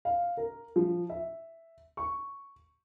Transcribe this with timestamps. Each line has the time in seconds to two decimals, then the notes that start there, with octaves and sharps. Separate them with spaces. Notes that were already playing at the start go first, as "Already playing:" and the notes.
0.05 F5
0.37 A#4
0.76 F3
1.10 E5
1.97 C#6